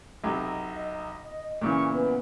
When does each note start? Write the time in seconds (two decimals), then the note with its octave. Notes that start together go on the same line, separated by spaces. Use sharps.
0.24 B1 C3 F#3 D#5
1.61 A#2 C#3 E3 C#6
1.92 B3